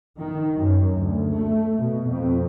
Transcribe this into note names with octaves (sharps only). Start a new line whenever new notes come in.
D#3
F#2
D2
A3
B2
F2